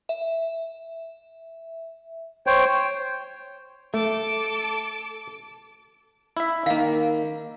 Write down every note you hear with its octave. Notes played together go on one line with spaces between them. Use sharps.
E5
C5 C#5 G5
A3 A4 D6
E4 E5
D#3 A#3 F5